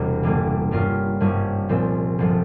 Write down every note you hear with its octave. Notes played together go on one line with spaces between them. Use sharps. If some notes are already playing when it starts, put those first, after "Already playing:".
Already playing: E1 E2 C3 G3
G1 G2 E3 G3 A#3
G2 G3 C#4 F4 A#4
G#1 G2 G3 C#4
C2 A#2 F3 G#3 C4
G1 F3